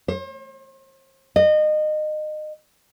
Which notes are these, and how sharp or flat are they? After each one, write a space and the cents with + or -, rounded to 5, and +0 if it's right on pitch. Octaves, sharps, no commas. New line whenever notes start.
C5 +40
D#5 -25